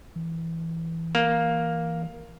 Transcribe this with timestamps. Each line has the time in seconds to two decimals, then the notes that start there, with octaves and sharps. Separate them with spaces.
0.16 E3
1.15 A#3